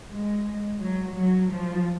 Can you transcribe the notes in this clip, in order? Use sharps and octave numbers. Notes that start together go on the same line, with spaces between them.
G#3
F#3
F#3
F3